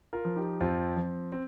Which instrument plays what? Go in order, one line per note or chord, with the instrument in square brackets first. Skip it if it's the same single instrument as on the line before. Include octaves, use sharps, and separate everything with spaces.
[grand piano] F4 A#4
F3
D#4 G4
F2 C4 F4
F3 C4
C4